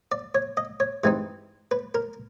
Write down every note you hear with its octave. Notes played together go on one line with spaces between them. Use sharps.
D5
C#5
D#5
C#5
G2 E3 G#3 C4 D#4
B4
A#4